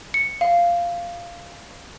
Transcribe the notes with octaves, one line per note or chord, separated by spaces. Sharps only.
C#7
F5